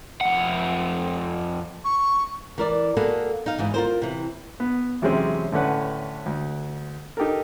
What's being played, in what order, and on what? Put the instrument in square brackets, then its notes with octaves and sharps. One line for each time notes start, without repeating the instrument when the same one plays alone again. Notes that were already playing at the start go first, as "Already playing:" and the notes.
[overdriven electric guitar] F2 F#5
[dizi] C#6
[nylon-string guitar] E3 A#4 D5
A#3 F#4 G#4 A4 B4
D#4 F5
D2 G#2 E3
F4 A#4 C5
C3 E3
[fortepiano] B3
E2 C3 F#3 G#3 C4 C#4
A2 D3 C#4 B4 F#5
D2
D#4 G4 A4 A#4